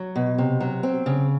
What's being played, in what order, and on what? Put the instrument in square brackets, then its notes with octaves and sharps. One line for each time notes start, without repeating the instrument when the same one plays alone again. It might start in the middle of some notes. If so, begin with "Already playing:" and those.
Already playing: [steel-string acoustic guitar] F#3
B2
C3
F#3
C4
C#3